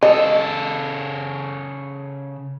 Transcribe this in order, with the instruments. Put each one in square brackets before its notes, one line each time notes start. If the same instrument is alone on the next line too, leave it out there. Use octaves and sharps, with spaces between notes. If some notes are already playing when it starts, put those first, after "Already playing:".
[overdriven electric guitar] C#3 A4 [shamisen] D#5